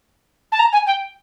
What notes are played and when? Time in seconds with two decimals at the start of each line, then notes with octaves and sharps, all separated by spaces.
0.52 A5
0.59 A#5
0.73 G#5
0.87 G5